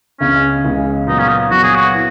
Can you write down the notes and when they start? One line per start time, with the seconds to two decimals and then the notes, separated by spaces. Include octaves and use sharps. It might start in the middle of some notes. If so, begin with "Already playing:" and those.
0.20 C#2 C#3 G#3 C#4
0.64 C#2 C#3 G#3
1.07 A#2 F#3 B3 D#4
1.19 C#4
1.29 D#4
1.50 A#2 F#3 B3 F#4
1.63 G#4
1.74 F#4
1.94 B3 E4